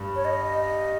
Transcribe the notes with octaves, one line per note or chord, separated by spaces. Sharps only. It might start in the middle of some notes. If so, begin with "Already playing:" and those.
Already playing: G2
C#5
D#5